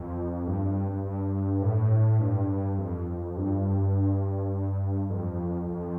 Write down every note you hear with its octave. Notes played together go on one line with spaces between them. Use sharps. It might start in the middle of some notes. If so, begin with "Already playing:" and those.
Already playing: F2
G2
G2
A2
G2
F2
G2
F2
F2